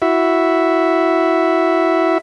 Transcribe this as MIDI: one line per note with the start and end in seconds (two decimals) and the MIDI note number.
0.02 2.18 64
0.02 2.18 66
0.02 2.18 76